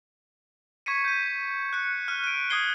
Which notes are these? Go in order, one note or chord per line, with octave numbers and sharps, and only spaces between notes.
C#6 G#6 B6 C#7 D#7
G6 D#7
F#6 C#7
F6 F#6 D#7
D7 D#7
D#6 F#6 G#6 C7 G7